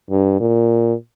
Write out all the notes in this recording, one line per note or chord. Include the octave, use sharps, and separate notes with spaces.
G2
A#2